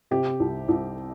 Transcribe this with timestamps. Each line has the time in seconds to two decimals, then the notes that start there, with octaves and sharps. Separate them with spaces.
0.11 C3 G4
0.40 C2
0.68 C2